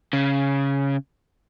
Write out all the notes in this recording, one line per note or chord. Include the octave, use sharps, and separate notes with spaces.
C#3